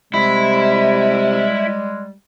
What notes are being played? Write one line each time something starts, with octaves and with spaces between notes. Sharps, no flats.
C3 G3 G#3 E4